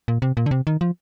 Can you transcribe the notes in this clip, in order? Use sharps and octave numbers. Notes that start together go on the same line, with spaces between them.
A#2
C3
A#2
D3
C3
D#3
F3